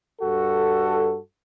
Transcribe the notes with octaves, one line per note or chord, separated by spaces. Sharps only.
G2 F#4 A4